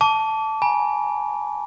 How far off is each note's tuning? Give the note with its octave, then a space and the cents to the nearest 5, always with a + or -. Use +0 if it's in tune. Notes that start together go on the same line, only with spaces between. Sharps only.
A5 -5 D6 -35
G#5 +0 B5 -45